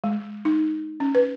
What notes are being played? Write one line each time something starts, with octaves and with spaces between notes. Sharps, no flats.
G#3
D#4
C#4
B4